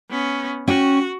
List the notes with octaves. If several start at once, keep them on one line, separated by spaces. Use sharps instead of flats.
B3 C#4
C#4 F#4 G5